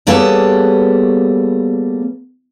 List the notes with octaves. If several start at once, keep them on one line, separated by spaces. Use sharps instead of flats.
G3 A#3 B3 G#4 A4 C#5